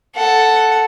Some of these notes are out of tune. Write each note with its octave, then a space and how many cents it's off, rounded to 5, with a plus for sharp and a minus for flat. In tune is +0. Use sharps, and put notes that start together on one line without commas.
A4 +0 F#5 +0